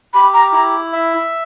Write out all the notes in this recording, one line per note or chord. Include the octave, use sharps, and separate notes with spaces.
G4 B5
A#5
E4 A#5
E5